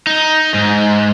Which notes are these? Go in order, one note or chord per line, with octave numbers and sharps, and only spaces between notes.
D#4
G#2